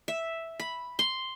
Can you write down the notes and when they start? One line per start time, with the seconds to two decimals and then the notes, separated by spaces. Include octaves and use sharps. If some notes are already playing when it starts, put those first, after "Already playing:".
0.08 E5
0.60 B5
0.99 C6